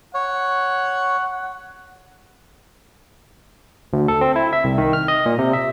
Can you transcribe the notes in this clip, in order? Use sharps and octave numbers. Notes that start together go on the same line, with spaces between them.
C#5 F#5
D2
A4
C4
E4
E5
C2
D#3
F6
D#5
A#2
C3
E5